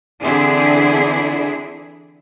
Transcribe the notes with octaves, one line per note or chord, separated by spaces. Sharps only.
D3 E3 C4 D4 E4 G#4